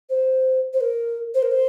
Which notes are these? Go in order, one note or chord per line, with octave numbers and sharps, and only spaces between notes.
C5
C5
A#4
C5
A#4
C5